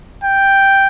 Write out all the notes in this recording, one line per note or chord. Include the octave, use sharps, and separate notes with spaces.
G5